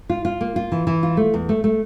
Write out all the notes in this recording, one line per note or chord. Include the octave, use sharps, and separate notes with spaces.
F4
F4
A#3
F4
E3
E3
F4
A3
E2
A3
A3